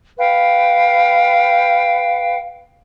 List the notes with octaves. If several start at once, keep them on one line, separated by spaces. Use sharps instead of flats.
B4 F5 G5